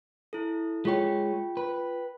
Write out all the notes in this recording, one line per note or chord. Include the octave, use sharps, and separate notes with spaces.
E4 A4
G#3 F4 C#5 G5
B4